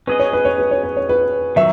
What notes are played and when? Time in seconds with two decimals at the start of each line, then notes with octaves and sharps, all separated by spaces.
0.07 C#4 G#4 B4 D#5
0.20 C#5
0.33 B4
0.45 C#5
0.58 B4
0.71 C#5
0.84 B4
0.97 C#5
1.09 B4
1.56 D#3 F#3 E5